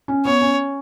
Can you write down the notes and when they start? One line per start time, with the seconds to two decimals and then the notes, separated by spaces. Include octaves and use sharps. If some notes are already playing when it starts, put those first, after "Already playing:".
0.08 C#4
0.25 B3 C#5
0.41 C#4